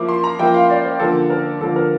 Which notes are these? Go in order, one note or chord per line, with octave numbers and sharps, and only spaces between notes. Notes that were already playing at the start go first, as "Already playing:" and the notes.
Already playing: F3 A#3 E4 D6
C6
A#5
F3 A#3 E4 G5
F5
D5
C5
D3 F3 A#3 A4
A#4
D3 F3 A#3 A4
A#4